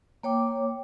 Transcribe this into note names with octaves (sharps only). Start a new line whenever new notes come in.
A#3 C#5 G5 D6